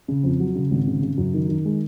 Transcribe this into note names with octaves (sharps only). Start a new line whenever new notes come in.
C#3
F2
F#3
C#3
G#1
C#3
C#3
F#2
D#3
D#3
G#3